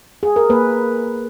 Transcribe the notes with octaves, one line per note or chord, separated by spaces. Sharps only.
G#4
A#4
A#3 B4